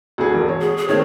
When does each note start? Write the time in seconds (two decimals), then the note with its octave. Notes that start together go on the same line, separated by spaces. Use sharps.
0.18 D2 D4 G#4
0.34 E1
0.47 F#4 C#5
0.61 G#4
0.77 G#4
0.88 D#3 A3 C4 C#5